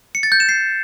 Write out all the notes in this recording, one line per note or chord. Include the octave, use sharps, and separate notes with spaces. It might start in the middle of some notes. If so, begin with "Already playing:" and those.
C#7
A6
G6
E7
C7